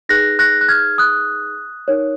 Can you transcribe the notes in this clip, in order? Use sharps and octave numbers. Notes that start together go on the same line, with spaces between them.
D#4 G#4 B4 F#6 A#6
F#6 A#6
F#6
F6 G#6
D#6 F#6
D#4 A#4 C#5